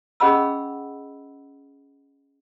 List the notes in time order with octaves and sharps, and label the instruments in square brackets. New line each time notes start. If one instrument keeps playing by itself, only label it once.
[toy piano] C#4 G#4 D#5 F#5 B5 E6